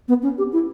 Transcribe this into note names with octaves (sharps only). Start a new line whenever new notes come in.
B3
C#4
G4
E4